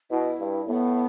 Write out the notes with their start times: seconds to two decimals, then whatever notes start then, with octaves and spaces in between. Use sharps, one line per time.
0.11 B2 E4
0.39 G2
0.67 A2 B3